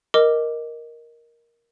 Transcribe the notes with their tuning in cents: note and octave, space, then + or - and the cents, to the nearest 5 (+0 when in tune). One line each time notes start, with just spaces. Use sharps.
A#4 +5 D#5 +0 D6 +0